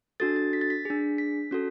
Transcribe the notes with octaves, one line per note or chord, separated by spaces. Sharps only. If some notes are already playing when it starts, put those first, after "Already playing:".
D4 F#4 A4 A6
A6
B6
A6
B6
D4 G#4
B6
C#4 F#4 A4